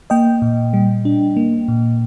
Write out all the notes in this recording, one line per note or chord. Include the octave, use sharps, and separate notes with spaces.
A#3 D#5 G5
A#2
G3
D4
A#3
A#2